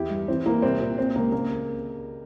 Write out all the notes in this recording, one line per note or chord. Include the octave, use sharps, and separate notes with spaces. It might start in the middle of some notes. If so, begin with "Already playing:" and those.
Already playing: E2 E3 E4 G4
G2
E3 C4
E3 A#3
C2 C4
A#2
C3 C4
C#2 A#3
C#3 A#3